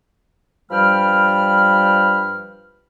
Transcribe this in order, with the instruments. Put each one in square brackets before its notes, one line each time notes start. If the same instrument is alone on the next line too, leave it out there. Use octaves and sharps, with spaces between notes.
[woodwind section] G2 F3 G3 G5 B5 F6